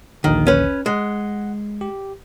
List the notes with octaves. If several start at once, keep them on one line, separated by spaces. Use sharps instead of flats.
A#1 D#2 D3 D#3
C#4 B4
G#3 F#5
G4